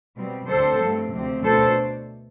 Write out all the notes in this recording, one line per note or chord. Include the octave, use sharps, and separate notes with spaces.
B2 G3 C4
D2 D3 G3 C4 A4 C5
G2 F3 A3 C4
D2 C3 F3 C4
B2 A3 D4 A4 C5